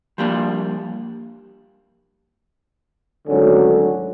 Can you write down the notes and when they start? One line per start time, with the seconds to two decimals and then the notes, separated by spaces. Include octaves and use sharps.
0.18 F3 G3 A#3 D4
3.27 G#1 D2 D3 F#3 C#4